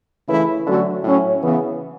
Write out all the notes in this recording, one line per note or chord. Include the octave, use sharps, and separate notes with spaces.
C#3 E3 A3 E4 B4
D3 F#3 A3 C#4 F#4
A2 F#3 C#4
C#3 E3 B3